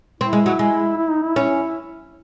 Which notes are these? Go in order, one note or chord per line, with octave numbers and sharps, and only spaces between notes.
C4 E4
G#3
F#3
G#3
E4
D#4
E4
C#4